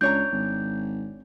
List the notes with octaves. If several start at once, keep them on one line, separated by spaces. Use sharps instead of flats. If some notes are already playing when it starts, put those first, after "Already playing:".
C#2 D4 C#5 A#5 G6
G#1